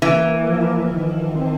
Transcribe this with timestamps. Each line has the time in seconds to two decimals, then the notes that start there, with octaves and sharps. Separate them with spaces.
0.02 E3 A#3
0.47 F3
0.91 D#3
1.35 C4